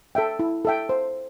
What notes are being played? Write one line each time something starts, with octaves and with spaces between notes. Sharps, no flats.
A4 E5 G5
E4
A4 E5 G5
C5